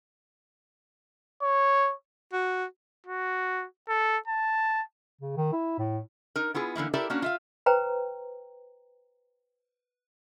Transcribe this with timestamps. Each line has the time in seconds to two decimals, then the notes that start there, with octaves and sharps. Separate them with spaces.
1.42 C#5
2.33 F#4
3.06 F#4
3.88 A4
4.28 A5
5.21 C#3
5.37 D#3
5.53 E4
5.78 A2
6.36 D#4 A#4
6.54 B3 E4 F4 G#4
6.76 D3 E3 A#3 E4
6.94 E4 G4 A4 A#4 D5 E5
7.10 A#3 C#4 D4 F#4
7.22 F4 E5 F5
7.66 B4 C5 G5 A#5